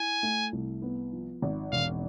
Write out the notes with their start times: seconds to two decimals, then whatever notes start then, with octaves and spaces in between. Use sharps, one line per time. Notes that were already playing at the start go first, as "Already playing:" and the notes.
Already playing: E4 G#5
0.23 A3
0.52 C2
0.82 B3
1.13 F3
1.42 G#1
1.72 E1 F5